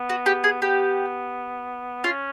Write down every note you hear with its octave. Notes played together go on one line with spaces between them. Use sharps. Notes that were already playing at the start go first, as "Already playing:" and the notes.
Already playing: B3
F#4
G4
G#4
B3 G4
C#4 F4